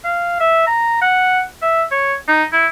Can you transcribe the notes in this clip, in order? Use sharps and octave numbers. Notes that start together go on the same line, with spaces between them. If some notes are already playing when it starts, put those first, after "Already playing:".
F5
E5
A#5
F#5
E5
C#5
D#4
E4